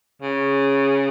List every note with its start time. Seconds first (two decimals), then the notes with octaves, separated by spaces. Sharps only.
0.22 C#3